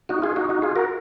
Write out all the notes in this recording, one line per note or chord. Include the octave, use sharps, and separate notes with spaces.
D#4 F#4
F4 G#4
D#4 F#4
D#4 F#4
F4 G#4
F#4 A#4